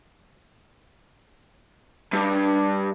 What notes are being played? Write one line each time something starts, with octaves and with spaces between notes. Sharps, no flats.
G2